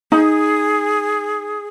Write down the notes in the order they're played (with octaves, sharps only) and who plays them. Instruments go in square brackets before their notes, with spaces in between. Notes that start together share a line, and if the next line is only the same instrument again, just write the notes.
[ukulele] D#4 [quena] G#4